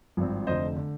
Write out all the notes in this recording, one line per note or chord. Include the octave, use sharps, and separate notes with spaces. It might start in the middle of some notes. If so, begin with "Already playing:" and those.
G#1 G2 F3 C4
F1 F2 D3 C5 D#5
D3